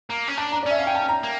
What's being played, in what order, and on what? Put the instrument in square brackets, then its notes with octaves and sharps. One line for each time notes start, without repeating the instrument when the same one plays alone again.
[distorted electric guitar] A#3 [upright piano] A#5
[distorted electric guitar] C#4
[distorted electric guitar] D4 [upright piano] A5
[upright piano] A#5
D5
[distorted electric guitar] C#4 [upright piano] E5
[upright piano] F5
G5
A5
A#5
[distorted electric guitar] A#3